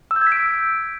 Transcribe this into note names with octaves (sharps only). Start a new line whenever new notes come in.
E6
G6
G#6
B6
D7